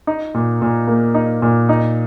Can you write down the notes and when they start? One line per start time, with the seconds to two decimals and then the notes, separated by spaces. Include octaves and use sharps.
0.07 D#4
0.34 A#2
0.62 A#2
0.87 A#3
1.14 D#4
1.42 A#2
1.69 D#4